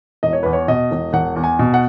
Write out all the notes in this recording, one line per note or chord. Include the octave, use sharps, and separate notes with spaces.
E1 D#5
C#5
E2 B4
C#5
B2 D#5
E1
E1 F#5
E2
G#5
B2
F#5